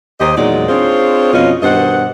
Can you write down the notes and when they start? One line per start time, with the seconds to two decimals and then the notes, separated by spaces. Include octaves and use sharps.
0.20 D#2 G4 C5 D#5
0.37 E2 A#2 F#3 G#3 D#4 D5
0.69 C4 D4 F4 G#4 C5 C#5
1.34 F2 B2 F3 C#4 F4 D#5
1.63 G2 B2 D#3 C5 D#5 F#5